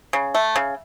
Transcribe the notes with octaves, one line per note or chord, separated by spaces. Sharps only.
C#3
A3
C#3